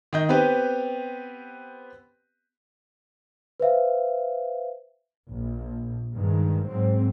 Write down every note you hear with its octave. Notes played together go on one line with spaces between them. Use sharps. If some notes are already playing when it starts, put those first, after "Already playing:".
D#3 D#5 G6
B3 C4 G4 B4
B4 C5 E5 F5
A#1
G2 D#3 G#3
G#2 F#3 C4